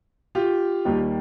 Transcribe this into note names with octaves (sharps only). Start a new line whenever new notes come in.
F4 G4
D#2 D#3 G3 A#3